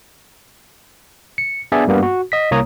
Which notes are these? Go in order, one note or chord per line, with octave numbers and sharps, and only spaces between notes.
C#7
B3 D4 G#4 D5 E5 G#5
G2 G3 A#3 B3
F#4
D#5 B6
C2 A#3 C#5 A#5 D#6